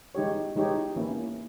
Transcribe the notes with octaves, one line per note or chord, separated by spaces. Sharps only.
E3 G#3 D#4 G4 C#5
E3 G#3 D#4 G4 C#5
E3 A#3 C#4 E4